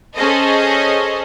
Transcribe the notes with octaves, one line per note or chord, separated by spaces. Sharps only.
C#4 G#4 A4 C5 D#5